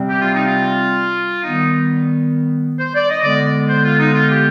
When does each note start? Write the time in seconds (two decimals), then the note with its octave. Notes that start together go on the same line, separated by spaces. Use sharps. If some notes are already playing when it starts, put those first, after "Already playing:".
Already playing: C3 G3 C4
0.09 G4
0.22 F4
0.35 D#4
0.47 F4
1.44 D#3 G3 B3 D#4
2.79 C5
2.95 D5
3.09 D#5
3.24 D3 G#3 B3 D5
3.69 C5
3.84 F4
3.99 D#4
4.14 F4
4.30 G4